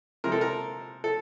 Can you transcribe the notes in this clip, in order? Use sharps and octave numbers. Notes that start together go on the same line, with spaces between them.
C3 F3 G#3 A#4
A4
A#4
A4